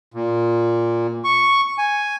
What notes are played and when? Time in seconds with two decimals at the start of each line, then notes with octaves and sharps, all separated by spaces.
0.14 A#2
1.24 C#6
1.78 G#5